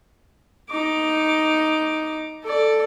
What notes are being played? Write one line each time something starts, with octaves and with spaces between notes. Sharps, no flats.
D#4 D6
A4 D5